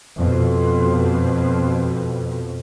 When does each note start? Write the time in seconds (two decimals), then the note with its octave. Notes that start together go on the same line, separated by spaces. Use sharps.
0.16 F2 B2